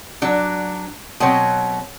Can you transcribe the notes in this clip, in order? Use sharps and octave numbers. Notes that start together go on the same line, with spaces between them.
F#3 D4
B2 F#3 C4 C#5